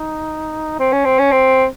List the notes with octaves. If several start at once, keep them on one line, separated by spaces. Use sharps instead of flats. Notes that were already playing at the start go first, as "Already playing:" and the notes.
Already playing: D#4
C4
C#4
C4
C#4
C4